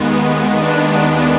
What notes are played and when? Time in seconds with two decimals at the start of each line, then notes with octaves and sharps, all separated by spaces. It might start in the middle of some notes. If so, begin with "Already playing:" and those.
Already playing: D#2 D#3 G#3 B3
0.61 D4